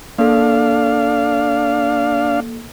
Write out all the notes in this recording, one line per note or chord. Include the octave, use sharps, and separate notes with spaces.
A#3 D4 A4 F5